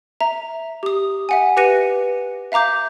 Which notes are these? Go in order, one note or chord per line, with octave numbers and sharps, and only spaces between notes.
E5 A#5
G4 D#6
E5 F#5 G#5
G4 B4 F#6 A#6 C#7 D#7
E5 F5 A#5 D6 G6